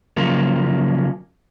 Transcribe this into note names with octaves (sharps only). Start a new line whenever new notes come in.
C#3 F3 F#3 A#3